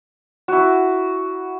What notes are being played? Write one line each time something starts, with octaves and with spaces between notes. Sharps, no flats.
E4 F#4